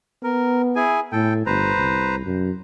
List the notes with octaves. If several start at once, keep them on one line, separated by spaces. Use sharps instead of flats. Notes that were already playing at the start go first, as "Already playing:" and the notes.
B3 A#4
E4 G#4 G#5
A2 A4 G5
G1 B4 C5 A#5
C2
F#2